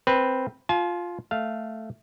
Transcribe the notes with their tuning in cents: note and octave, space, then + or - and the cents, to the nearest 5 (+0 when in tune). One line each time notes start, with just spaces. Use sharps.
C4 +0 B4 -5
F4 +5 A5 -45
A3 +0 F5 +0